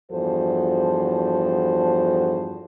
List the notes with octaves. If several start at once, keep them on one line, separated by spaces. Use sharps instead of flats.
E2 G2 F3 F#4 A4 C5